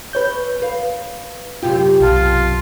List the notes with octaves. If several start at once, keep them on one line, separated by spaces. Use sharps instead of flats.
B4 C#5 G6
B4 F5
F#2 C3 F4 G4
B1 F4 A5